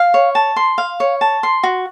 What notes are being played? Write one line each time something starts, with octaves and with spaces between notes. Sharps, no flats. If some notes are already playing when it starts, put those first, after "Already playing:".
Already playing: F5
C#5
A5
C6
F5
C#5
A5
C6
F#4